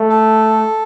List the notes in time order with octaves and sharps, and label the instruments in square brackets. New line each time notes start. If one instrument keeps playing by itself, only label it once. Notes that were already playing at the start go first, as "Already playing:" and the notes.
Already playing: [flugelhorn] A3
[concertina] A4